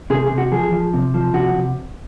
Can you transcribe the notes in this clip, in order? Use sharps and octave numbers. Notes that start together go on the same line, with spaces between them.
C3 G#4
G#4
C3
F#4
F3 G#4
F3
C3
F3
C3 F#4
C3